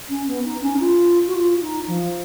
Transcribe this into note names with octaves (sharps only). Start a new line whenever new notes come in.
C#4
B3
D#4
C#4
D#4
F4
F#4
F4
D#4
F3